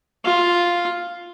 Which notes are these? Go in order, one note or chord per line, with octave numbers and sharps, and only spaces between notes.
F4